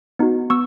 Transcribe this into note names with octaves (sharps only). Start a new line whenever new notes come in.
B3 D#4 F#4
B3 C#6 E6